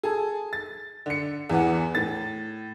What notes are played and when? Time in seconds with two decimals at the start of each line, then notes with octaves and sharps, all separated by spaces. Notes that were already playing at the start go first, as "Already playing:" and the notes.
0.03 G#4 A4
0.53 A6
1.06 D3 C#7
1.49 E2 E3 B3 F#5
1.95 A2 A6